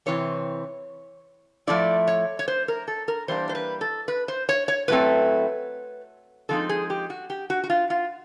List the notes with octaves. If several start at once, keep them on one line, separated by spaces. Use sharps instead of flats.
C3 E3 C4 C#5
A2 F3 A3 C4 E4 D5
C#5
C#5
C5
A#4
A4
A#4
E3 G3 A#3 D4 C5
C5
B4
A4
B4
C5
C#5
C#5
A2 F#3 A3 C4 B4
D3 F3 G#3 C4 D#4 A4
G#4
G4
F#4
G4
F#4
F#4
F4
F4